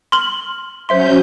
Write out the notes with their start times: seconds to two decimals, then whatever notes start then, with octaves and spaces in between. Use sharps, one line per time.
0.12 C6 F6 F#7
0.89 F#3 C#4 C5 E5 C6 G6